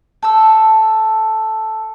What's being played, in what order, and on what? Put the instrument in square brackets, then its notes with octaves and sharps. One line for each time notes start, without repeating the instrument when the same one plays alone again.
[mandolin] A4 E6